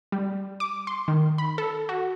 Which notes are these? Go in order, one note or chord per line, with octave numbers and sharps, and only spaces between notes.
G3
D6
C6
D#3
B5
A4
F#4